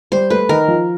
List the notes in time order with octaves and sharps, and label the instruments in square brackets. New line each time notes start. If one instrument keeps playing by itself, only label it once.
[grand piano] G3 [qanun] C5
[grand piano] A3 [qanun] B4
[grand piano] D#3 [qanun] A#4
[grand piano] F3